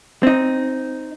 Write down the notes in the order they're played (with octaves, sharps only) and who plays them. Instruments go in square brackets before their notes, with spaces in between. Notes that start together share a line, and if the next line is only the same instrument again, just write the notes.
[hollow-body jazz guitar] C4 D#4